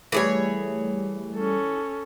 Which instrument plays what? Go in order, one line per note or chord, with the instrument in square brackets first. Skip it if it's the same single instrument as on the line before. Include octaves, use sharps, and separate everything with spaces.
[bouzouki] E3 G#4 C#5 [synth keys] G3 A3
[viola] C#4 A4